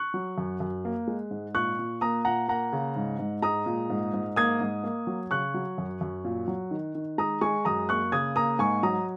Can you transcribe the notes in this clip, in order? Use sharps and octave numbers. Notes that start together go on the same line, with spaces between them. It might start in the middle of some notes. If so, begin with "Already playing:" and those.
Already playing: C#6 F#6
F#3
F#2
F#2
A#3
G#3
G#2
A#2 C#6 F#6
A#2
A#3 A#5 D#6
A#2 F#5 A#5
A#3 F#5 A#5
C#3
G#2
G#2
G#3 A#5 D#6
A#2
G#2
G#2
A#3 D#6 G#6
G#2
A#3
F#3
C#3 C#6 F#6
F#3
F#2
F#2
A#2
F#3
D#3
D#3
G#3 A#5 D#6
G#3 G#5 C#6
F#2 A#5 D#6
A#3 C#6 F#6
C#3 D#6 G#6
A#3 A#5 D#6
G#2 G#5 C#6
F#3 A#5 D#6